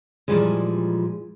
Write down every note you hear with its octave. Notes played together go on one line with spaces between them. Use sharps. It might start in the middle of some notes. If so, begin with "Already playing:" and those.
A#2 E3 F3 G3 G#3